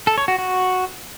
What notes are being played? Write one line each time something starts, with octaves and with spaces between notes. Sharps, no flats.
A4
C#5
F#4
F#4